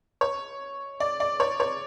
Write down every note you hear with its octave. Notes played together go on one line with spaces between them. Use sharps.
C#5
D5
D5
C#5
C#5